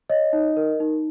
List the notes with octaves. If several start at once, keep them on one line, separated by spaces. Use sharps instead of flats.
C#5 D#5
D#4
A#4
D#4